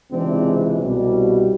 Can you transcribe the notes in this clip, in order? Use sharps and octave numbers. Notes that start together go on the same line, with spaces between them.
C#2 C3 E3 G#3 C4 D4
C2 B2 G3